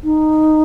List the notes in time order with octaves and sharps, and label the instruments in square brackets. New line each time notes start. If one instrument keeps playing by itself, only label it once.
[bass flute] D#4